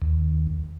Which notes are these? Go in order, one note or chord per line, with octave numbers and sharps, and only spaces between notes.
D#2